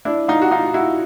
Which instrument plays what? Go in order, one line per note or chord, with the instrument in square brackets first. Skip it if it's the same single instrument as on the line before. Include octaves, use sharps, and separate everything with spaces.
[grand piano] D4 E4
D#4 F4
F#4
D#4 F4
E4 F#4